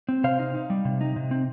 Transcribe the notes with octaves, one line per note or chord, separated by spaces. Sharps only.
C4
C3 C5 F5
D#4
D#4
G3
C3
D#4
C3
C4